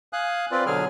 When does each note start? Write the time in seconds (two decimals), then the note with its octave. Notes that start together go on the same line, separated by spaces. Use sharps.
0.13 F5 G#5 D#6 F#6
0.51 C4 F4 B4 D5
0.66 B2 D3 F#3 G#4 G#5 F6